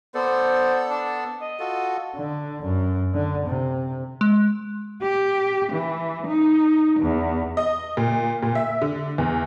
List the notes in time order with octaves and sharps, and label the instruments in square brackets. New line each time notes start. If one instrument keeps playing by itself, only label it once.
[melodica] B3 A4 D5 [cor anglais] C5
[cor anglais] D4
D#5
[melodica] F4 F#4 A4
[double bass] D3
F#2
D3
C3
[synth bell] G#3
[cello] G4
E3
D#4
E2
[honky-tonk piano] D#5
A#2
A#2
E5
D3
E2